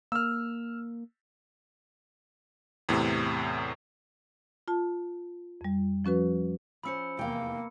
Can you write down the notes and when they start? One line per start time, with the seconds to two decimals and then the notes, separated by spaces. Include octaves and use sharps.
0.12 A#3 E6 F6
2.89 E2 A2 C3
4.68 F4 A5
5.61 F2 G3
6.05 F3 C#4 F#4 B4
6.83 F3 C#4 C5 B5 E6 C#7
7.19 F1 E2 A#3 F5 G5